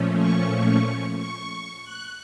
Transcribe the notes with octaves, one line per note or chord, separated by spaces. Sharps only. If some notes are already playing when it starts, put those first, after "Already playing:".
Already playing: A#2 F3 A3 C#4
C#6
C#6
F#6